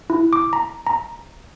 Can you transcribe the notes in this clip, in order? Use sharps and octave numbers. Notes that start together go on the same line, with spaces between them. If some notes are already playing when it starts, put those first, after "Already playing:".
E4
D6
A#5
A#5